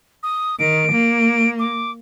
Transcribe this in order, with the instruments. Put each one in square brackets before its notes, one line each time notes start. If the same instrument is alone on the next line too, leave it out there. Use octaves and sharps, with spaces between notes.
[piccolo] D#6
[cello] D#3 [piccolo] D7
[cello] A#3
[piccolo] D6